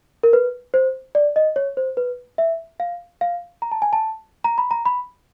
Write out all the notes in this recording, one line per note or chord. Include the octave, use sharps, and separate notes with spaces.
A#4
B4
C5
D5
D#5
C#5
C5
B4
E5
F5
F5
A#5
A5
G#5
A5
A#5
B5
A#5
B5